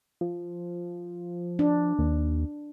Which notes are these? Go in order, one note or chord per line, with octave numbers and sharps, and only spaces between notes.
F3
D4
D#2